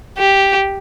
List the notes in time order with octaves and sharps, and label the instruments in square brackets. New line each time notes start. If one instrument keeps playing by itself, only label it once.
[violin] G4